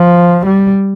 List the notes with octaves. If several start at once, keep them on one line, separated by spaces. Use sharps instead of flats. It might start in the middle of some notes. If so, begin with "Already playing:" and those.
Already playing: F3
G3